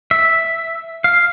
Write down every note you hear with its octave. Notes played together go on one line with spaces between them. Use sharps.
E5
F5